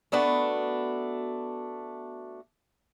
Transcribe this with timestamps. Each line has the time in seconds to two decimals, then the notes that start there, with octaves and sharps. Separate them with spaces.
0.12 A3 B3 D4 F#4